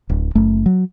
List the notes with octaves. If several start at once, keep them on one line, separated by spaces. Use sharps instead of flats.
D1
F#1 A3
F#3